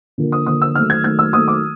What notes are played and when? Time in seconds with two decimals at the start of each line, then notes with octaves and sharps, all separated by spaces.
0.18 D3 F3 A#3
0.32 D#6
0.46 D3 F3 A#3 D#6
0.62 E6
0.75 D#3 F#3 A3 F6
0.90 G#6
1.04 D#3 F#3 A3 G#6
1.19 E6
1.33 D#3 F#3 A3 D#6
1.48 D6